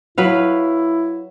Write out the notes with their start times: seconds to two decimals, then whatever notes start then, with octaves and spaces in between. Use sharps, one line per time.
0.18 F#3 E4 B4 F5